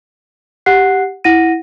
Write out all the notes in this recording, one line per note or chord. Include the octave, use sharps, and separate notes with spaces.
G4 F#5 F#6 C7
E4 F#5 A#6 D#7